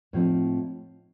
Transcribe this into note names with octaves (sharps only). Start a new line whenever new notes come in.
A2 F3 C4 D#4